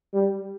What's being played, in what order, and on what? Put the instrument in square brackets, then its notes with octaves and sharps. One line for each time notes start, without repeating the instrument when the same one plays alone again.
[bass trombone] G3